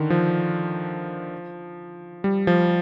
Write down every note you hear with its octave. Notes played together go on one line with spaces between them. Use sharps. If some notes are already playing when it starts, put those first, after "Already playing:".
Already playing: D3 D#3
F3
G3
F3